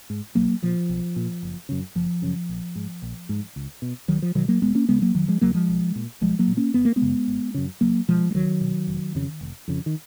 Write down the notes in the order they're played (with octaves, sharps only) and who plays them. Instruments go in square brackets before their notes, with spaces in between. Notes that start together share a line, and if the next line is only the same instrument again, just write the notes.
[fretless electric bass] G#2
B1 F#3 A#3
A#2 F3
B1
A#2
F#1
F#2 C#3
F#1 F3
F#2 C#3
A#1
G#2
A#1
G#2
C#2
B2
C#2 D#3 F#3
F3
B2 D#3 F#3
F#3 A#3
F1 G#3 B3
A#3 C#4
D#2 C#3 G#3 B3
F#3 A#3
F1 D#3 F#3
F3 G#3
D#2 C#3 F#3 A#3
F3 G#3
B1
A#2
B1 F3 G#3
F#3 A#3
A#2
A#3 C#4
G#1 B3
A#3
G#3 B3
F#2 C#3
G#1
F#2 C#3
C#2 F#3 A#3
B2 F3 G#3
G#3
C#2 D#3 F#3
B2
F1
F2 C#3
F1
F2 C#3
D#3